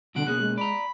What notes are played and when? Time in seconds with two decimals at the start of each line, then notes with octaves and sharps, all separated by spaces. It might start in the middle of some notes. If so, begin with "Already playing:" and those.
0.15 C2 B2 D3 F#5 D7
0.27 B2 A#3 C#4 G#4 F#6
0.41 G#3
0.58 D5 A#5 B5